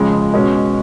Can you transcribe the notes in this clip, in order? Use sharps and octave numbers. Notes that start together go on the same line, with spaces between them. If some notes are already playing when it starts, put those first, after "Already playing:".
Already playing: F2 C#3 F3 G#3
B2 G#3 C#4